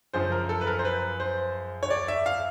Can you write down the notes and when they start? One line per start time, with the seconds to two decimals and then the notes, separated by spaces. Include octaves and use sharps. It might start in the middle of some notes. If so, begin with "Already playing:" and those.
0.14 F#2 C#3 F3 C5
0.32 A#4
0.49 A4
0.61 B4
0.67 A#4
0.79 C5
0.85 B4
1.20 C5
1.83 C#5
1.90 D5
2.08 E5
2.26 F5